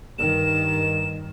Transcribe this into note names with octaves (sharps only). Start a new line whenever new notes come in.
G2 D#3 E7